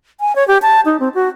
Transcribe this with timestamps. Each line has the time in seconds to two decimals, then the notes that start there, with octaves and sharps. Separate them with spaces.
0.20 G#5
0.36 C#5
0.48 G4
0.62 A5
0.85 D#4
1.00 C4
1.15 F#4